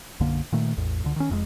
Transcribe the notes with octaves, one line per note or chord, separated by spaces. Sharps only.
B1 F#2 D3 A#3
A#2 D#3 A3
A1 E2
C#2 D3
D#3 C#4
F1 F2 A#2 G#3